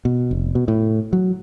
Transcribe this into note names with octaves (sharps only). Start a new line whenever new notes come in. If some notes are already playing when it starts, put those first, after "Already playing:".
B2
F1
B2
A2
F#3